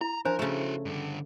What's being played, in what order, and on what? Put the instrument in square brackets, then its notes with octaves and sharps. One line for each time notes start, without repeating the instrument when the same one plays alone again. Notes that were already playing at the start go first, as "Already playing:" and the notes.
[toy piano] E4 [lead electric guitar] A#5
[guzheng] F3 [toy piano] D4 C5 A#5 [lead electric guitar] A#4
[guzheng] C#3 A3 [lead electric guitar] E4 F#4
[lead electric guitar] G2 D3